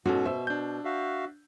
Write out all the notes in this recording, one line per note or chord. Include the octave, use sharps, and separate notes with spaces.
G#2 B2 C#4 F#4 A4
C5 E5 E6
D4 G6
F#4 E5 F5